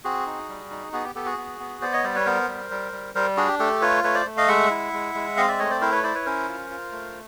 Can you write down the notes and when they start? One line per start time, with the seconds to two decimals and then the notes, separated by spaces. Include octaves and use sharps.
0.04 C4 F#4 G#4
0.26 D#4
0.49 G3
0.71 D#4
0.93 B3 F#4 G#4
1.04 G4
1.15 B3 G4 A4
1.26 F#4 G#4
1.37 B3
1.60 B3
1.81 B3 C5 D5
1.93 C#5 D#5
2.04 G3 C5 D5
2.15 B4 C#5
2.26 B3 A#4 C5
2.48 G3
2.71 G3
2.92 G3
3.15 G3 A#4 C5
3.37 D4 F#4 G#4
3.48 G4
3.59 A3 G4 A4
3.81 F4 B4 C#5
4.04 A3 B4 C#5
4.15 C5 D5
4.26 A3
4.37 D#5 F5
4.48 G#3 E5 F#5
4.71 E4
4.93 G#3
5.15 G#3
5.37 C4 D#5 F5
5.48 D5 E5
5.59 A3 C#5 D#5
5.70 C5 D5
5.81 E4 A#4 C5
5.92 B4 C#5
6.03 E4 C5 D5
6.15 B4 C#5
6.26 C#4 A#4 C5
6.48 F4
6.70 F4
6.92 A3